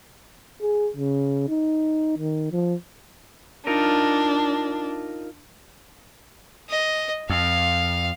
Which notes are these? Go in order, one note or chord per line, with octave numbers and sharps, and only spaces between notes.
G#4
C#3
D#4
D#3
F3
D4 D#4 F4 A#4
D#5
F2 F5